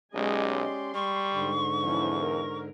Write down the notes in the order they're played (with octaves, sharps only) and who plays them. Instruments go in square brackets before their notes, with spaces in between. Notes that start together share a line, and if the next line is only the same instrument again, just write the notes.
[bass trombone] B1 [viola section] G#3 D#5 G#5 [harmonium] C#4 G4 D5
[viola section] C6
[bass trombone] G3 [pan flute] C#6
[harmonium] G#2 D3
[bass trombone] E2 [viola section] F3 C#4 E4
[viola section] A#4